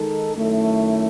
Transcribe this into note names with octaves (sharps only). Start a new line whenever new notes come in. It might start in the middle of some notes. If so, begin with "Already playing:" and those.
Already playing: D#3 G#3 D#4 A4
F#2 D#3 A3 C#4 E4